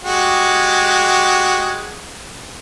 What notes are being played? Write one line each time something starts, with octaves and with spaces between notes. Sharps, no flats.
G#3 F#4 G4